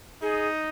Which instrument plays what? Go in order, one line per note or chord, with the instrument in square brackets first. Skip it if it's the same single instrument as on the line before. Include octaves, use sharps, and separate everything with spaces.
[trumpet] D#4 [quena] G#4